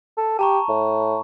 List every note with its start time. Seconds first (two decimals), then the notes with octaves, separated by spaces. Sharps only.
0.17 A4
0.39 G4 A5 A#5 C#6
0.69 A2